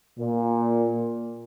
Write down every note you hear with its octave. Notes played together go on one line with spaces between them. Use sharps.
A#2